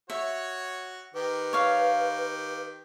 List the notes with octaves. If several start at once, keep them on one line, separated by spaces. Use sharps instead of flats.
F#4 C#5 E5
D#3 G4 B4
C#5 F5